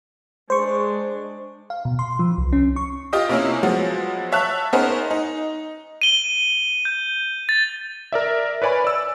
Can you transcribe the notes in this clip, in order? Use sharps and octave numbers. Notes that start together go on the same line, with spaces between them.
G#3 D4 C5 C#6
F5
B2
C6
F3
C2
C#4
C#6
F4 G4 D#5 D#6
C3 A#3 C#4 E4
F3 F#3 G#3 B3
C#5 E5 A5 F#6
B3 C#4 D#4 G#4 A#4 C5
D#4
D#7 G7
G6
A6
A#4 D5 E5
B4 C#5 D5 G#5 B5
D5 E6